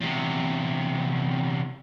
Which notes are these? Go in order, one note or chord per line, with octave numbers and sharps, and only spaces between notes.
E2 C3